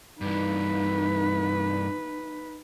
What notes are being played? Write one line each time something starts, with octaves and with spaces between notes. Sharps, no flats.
G2 E3 D#4 B4